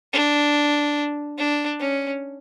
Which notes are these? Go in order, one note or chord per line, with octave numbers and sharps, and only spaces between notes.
D4
D4
C#4